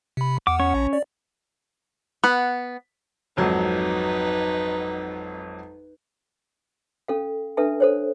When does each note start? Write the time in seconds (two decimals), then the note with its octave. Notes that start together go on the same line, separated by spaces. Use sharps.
0.17 C3 B5
0.47 E2 F#5 D6
0.60 C#4 C#5 C#6
0.74 A#1
0.93 D5
2.24 B3 F#5
3.37 G#1 F2 F#3 D#4 B4
7.08 C#4 A4 F5
7.57 D4 A4 B4 E5 A5
7.80 A4 C5 C#5